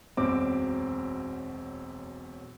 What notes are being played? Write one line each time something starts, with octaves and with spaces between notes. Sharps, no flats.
E1 B1 F#2 C4 D6